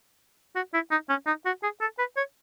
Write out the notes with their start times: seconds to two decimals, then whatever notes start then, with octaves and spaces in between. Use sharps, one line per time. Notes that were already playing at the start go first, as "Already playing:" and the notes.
0.56 F#4
0.74 E4
0.91 D#4
1.09 C#4
1.27 D#4
1.46 F#4
1.63 G#4
1.81 A4
1.99 B4
2.17 C#5